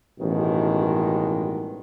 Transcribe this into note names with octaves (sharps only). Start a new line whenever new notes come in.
A1 G2 B2 D#3 G#3